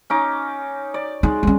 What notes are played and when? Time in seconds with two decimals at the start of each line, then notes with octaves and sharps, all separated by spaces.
0.10 C#4 D#4 D6
0.94 D5
1.23 G#3 D#4
1.43 G3 C#4